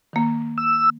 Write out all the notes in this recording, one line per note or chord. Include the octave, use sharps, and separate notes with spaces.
D#3 A#3
E6